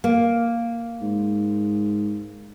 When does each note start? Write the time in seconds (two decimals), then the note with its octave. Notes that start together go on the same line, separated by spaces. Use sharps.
0.04 A#3
1.01 G#2